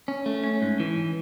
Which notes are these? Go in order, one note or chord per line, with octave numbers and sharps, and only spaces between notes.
C#4
A3
C#4
G#2
E3